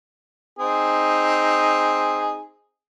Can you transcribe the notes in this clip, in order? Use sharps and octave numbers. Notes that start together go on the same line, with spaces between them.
C4 D#4 G#4